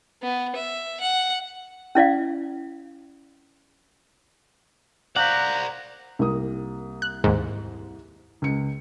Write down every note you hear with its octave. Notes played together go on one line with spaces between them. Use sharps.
B3
E5
F#5
C#4 E4 D5 F5
C5 D5 F5 F#5 A#5 G6 B6
C2 A#3 D#6
F#6
D#2 G#2
C#2 C#7